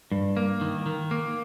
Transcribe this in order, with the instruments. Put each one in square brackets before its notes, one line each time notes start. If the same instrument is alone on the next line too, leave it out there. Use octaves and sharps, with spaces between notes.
[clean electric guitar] G2
A#3
D#3
D#3
A#3